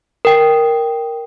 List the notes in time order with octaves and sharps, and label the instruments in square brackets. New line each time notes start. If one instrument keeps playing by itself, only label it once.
[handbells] A#4 G5